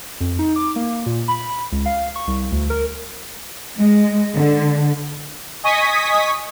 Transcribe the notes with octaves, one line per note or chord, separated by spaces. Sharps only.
F2
D#4
D6
A#3
A#2
B5
C#2
F5
C#6
C2
D2
A#4
G#3
D3
D#5 G#5 C#6 D#6 B6